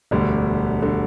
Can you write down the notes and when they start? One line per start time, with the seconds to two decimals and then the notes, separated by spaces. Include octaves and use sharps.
0.11 E1 D2 D3 G3
0.81 D3 G3